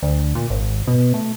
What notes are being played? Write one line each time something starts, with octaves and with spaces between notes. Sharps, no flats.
D2
A#2
G#1
B2
A3